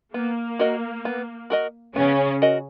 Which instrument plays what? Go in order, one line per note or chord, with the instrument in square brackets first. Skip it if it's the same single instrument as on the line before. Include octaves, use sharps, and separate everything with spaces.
[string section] A#3 [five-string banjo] B3
[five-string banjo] F#4 A#4 D#5
B3
F#4 A#4 D#5
[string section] C#3 C#4 [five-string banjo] B3
[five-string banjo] F#4 A#4 D#5